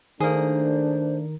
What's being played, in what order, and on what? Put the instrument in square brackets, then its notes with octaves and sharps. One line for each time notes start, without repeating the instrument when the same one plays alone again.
[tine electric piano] D#3 A#4 [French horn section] A3 D4 [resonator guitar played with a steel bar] A#3 G#4 [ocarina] C5